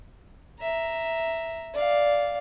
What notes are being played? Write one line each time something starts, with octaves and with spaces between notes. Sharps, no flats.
E5 A#5
D5 F5